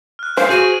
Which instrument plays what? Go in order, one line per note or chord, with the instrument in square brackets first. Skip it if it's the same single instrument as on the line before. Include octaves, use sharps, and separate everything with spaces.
[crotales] F6 F#6
[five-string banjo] C5 [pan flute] F5 [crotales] F6 D7
[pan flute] F#4 [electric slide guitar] G#4 [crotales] D#7 E7 F#7